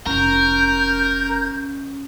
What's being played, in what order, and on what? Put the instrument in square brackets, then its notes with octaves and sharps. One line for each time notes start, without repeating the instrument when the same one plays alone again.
[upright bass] F1 E4 [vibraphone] C#4 [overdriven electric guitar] A#4 [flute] G6